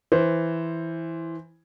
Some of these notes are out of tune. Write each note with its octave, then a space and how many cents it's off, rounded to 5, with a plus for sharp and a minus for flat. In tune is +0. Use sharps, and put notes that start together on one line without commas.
E3 +0 C5 +5